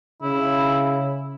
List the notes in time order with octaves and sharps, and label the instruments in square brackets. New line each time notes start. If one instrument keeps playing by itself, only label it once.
[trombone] C#3 [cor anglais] E4